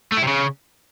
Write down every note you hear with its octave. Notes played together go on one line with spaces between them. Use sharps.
A3
E4
C3
C#3